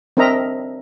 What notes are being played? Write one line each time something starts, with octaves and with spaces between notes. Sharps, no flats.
C4 D4 A#4 D#5 E5 A#5